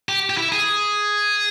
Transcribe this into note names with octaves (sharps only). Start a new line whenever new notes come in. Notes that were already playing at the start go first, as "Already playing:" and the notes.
G4
G4
E4
G#4